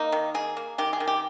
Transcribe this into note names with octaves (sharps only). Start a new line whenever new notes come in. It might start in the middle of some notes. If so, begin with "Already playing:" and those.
Already playing: A#3 D#4
D#3
A#3 G#4
A#3
D#3 G4
G#4
D#3
G4